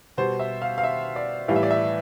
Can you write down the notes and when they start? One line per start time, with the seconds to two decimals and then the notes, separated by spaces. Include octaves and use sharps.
0.17 B2 G3 C5
0.40 E5
0.62 F5
0.78 F5
0.83 E5
1.16 D5
1.48 A2 E3 G3 F5
1.56 E5
1.63 D5
1.71 E5